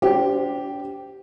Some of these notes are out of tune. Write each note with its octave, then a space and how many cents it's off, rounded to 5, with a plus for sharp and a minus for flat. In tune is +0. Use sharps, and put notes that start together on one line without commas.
D4 -45 G4 -10 C5 -20